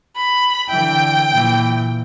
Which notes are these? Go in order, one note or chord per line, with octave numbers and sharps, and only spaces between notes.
B5
D3 E3 G5
A#2 E3